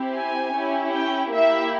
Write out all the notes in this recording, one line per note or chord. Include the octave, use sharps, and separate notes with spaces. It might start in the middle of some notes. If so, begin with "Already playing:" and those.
Already playing: C4 E4 G4
G#5
C#4 E4 G4
G5
A#3 E4 G4 E5